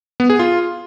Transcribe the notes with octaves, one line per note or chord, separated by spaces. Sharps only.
B3
G#4
F4